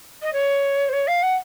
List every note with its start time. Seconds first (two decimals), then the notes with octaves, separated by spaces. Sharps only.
0.22 D#5
0.33 C#5
0.88 C5
0.92 C#5
1.07 F5
1.22 F#5